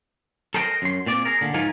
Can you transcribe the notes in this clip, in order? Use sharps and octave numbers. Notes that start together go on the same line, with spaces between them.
A4 A#4 C5 D#5 G5 A#5
F#2 C6
A#2 C4 D5
G#4 A#4
A#2 D3
G#2 F3 D#4 F4 A#4 G#5